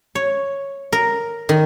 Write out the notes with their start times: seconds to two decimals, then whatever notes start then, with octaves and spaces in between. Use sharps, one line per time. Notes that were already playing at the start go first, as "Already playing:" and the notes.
0.15 C#5
0.92 A#4
1.49 D#3